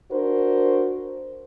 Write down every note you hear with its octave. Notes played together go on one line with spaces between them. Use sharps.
D4 F#4 A#4 C5